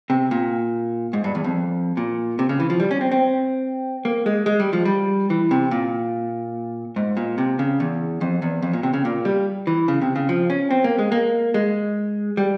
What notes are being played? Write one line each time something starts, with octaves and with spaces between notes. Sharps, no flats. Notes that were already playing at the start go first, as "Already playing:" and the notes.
C3
A#2
G#2
G2
E2
F2
A#2
C3
C#3
E3
F3
G3
C#4
C4
C4
A#3
G#3
G#3
G3
F3
G3
E3
C3
A#2
G#2
A#2
C3
C#3
E2
F2
E2
F2
A#2
C3
C#3
A#2
G3
E3
C#3
C3
C#3
F3
C#4
C4
A#3
G#3
A#3
G#3
G3